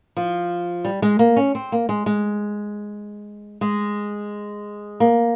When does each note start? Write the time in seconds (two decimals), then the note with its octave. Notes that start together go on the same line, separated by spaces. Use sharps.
0.17 F3
0.85 G3
1.02 G#3
1.19 A#3
1.37 C#4
1.55 C4
1.72 A#3
1.89 G#3
2.06 G#3
3.61 G#3
5.00 A#3